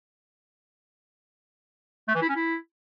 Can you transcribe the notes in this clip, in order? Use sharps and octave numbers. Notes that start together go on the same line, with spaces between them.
A3
E3
E4
C#4
E4